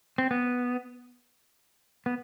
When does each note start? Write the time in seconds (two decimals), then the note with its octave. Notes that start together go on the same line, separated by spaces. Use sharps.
0.18 C4
0.31 B3
2.06 B3